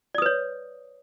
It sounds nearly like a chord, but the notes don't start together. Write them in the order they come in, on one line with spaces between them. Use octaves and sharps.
D5 D#6 B4 C#5